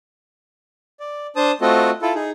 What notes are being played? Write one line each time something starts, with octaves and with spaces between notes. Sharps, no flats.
D5
D4 C5 A5 D#6
A3 C4 F4 F#4 A4 D#5
E4 F4 A4
D#4 G#4